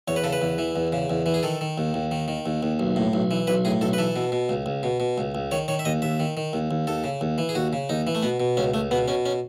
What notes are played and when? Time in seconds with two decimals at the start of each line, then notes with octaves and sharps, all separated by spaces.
0.08 E2 C#5
0.16 B4
0.24 C#3 A4
0.33 B4
0.42 E2
0.58 E3
0.76 E2
0.92 C#3
1.10 E2
1.26 E3
1.34 G#4
1.43 D#3 A4
1.61 D#3
1.78 D#2
1.94 D#2
2.11 D#3
2.28 D#3
2.46 D#2
2.63 D#2
2.80 B1
2.96 A2
3.13 B1
3.31 E3
3.47 B1 B4
3.65 A2 G#4
3.81 B1 A4
3.93 B4
3.98 E3 A4
4.16 B2
4.32 B2
4.49 C#2
4.66 C#2
4.83 B2
5.00 B2
5.18 C#2
5.35 C#2
5.52 D#3 C#5
5.68 D#3 C#5
5.79 E5
5.85 D#2 D#5
6.02 D#2 E5
6.20 D#3
6.37 D#3
6.53 D#2
6.71 D#2
6.87 D#2 A4
7.04 C#3
7.21 D#2
7.38 E3
7.49 G#4
7.55 D#2 F#4
7.73 C#3
7.89 D#2 D#4
8.07 E3
8.15 A3
8.23 B2 B3
8.40 B2
8.57 C#2 C#4
8.74 C#2 A3
8.91 B2 B3
9.08 B2 C#4
9.26 C#4